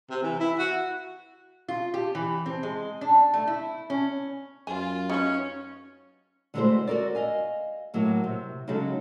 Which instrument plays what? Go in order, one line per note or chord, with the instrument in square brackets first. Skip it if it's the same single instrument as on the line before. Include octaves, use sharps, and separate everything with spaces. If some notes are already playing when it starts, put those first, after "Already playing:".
[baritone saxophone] C3
E3
E4
F#4
[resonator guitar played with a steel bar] F4
G4
E3
C4
G#3
D4
A3
E4
C#4
[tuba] F#2 [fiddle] F4 [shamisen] G#5
[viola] C#4 [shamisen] D#4 B4
[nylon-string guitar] D3 G#3 A3 E4 F#4 C5
F#4 A4 A#4 D5
D#5 F5 G#5
A2 F#3 A#3 E4
C3
C#3 F#3 G#3 D#4 F#4 A4